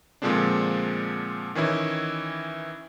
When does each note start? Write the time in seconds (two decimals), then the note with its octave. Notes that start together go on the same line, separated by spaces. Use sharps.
0.22 A#2 D3 F3 G#3 C4 D4
1.55 D#3 E3 C#4 E4